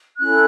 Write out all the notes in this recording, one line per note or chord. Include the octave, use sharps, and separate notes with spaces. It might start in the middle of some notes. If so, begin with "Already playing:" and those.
C#4 E4 A4 F#6